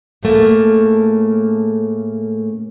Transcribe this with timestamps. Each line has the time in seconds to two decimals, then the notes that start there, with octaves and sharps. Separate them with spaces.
0.23 A2 C#3 A3 A#3